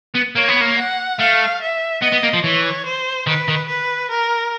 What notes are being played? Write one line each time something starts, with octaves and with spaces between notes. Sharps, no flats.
B3
A#3 C#5
B3
A#3
F#5
A3 F5
E5
B3 D#5
B3
A#3
F3
E3 C#5
C5
D#3 B4
D#3
B4
A#4